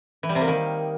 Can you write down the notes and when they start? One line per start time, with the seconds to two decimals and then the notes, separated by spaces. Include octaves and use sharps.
0.23 E3
0.29 G3
0.35 C3
0.41 A#3
0.47 D#3